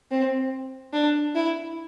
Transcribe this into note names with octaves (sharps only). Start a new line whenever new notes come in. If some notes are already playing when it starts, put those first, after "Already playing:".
C4
D4
E4